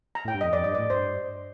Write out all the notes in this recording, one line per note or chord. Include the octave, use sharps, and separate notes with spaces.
A#5
A2
G5
G2
F2 D#5
F2 D5
G2 D#5
A2 D5
G2 C5